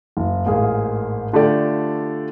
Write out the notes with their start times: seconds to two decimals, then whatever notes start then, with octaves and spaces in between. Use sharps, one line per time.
0.17 F#1
0.46 A1 G#2 A#3 G#4 F5
1.33 D3 A3 F4 G4 A4 D5